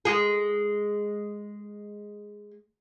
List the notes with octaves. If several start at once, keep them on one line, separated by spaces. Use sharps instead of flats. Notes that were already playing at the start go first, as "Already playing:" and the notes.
G#3 G#4